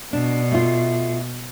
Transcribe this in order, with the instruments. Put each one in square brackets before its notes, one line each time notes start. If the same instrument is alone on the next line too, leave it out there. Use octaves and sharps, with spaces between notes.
[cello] B2 [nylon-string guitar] D4
[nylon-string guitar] A3 F4